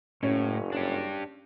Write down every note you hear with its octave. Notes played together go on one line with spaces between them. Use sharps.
F#1 A2 C#4
D4 G4